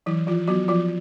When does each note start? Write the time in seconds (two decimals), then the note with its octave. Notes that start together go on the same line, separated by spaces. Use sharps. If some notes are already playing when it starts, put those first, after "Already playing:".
0.06 E3 F#3 E4
0.27 F3 F4
0.48 F#3 B3 F#4
0.68 F3 F4